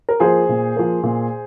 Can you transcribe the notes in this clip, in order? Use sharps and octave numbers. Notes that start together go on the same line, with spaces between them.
A#4
F3 A#3 G#4 C5
A#2
F3 A#3
A#2